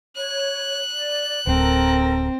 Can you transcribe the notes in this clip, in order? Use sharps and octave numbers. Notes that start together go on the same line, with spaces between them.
C#5 F#6
D5
D1 C4 A4 A#4